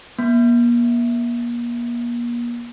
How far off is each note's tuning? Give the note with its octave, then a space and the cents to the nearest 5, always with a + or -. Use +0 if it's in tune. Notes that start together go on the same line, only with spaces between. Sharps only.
A#3 +40